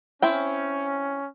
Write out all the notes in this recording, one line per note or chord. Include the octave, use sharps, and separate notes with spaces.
C4 C#4 E4 G5